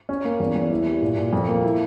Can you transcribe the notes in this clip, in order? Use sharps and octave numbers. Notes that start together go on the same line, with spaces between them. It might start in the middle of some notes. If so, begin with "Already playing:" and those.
C#4
A#3
E2
E2
E4
G3
A#2
A#2
F2
A#3
E4